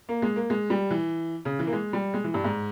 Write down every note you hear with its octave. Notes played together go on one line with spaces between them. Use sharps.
A#3
G#3
A#3
G#3
G3
E3
C#3
E3
A#3
G#3
G3
G#3
E3
G2
G#2